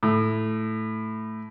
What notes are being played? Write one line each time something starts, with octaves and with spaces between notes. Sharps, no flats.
A2